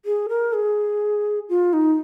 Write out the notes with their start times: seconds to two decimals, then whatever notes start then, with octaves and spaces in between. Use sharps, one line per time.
0.05 G#4
0.29 A#4
0.53 G#4
1.49 F4
1.73 D#4